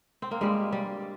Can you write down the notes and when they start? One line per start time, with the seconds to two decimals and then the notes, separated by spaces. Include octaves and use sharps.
0.22 C4
0.31 A#3
0.41 G2 G3 G#3
0.72 G3